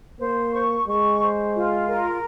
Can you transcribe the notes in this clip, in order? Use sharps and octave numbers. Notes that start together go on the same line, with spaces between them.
A#3 C5
C#6
G#3 C#6
C5
F4
A#4